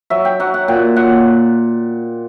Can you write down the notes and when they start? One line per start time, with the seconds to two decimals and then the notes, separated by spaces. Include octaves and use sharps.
0.10 F#3 E5
0.25 G5
0.40 F#3 F#5
0.54 F#5
0.68 A#2 G5
0.96 A#2 F#5